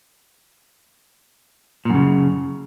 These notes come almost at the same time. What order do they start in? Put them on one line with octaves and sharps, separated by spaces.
A#2 F#2 C#3